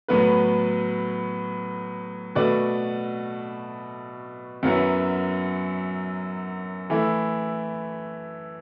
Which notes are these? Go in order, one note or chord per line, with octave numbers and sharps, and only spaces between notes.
A2 F#3 B3 F#4 B4
B2 A3 F#4 B4 D5
F#2 F#3 B3 E4 B4
E3 A3 E4